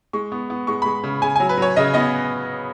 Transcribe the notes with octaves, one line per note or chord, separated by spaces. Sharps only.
G#3 C#6
B3
B3
G#3 C#6
G#3 B5
C#3
C#3 G#5
F#3 G#5
B4
F#3 C#5
C#3 D#5
B3 D#5